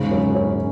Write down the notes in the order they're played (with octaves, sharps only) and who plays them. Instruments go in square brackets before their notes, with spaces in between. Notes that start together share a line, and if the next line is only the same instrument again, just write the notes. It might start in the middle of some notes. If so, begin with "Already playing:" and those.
Already playing: [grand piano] E1 C#3 [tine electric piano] G#2
[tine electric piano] F#2 [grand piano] C#4
[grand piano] C#4